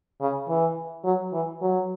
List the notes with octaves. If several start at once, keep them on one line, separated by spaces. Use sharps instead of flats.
C#3
E3
F#3
E3
F#3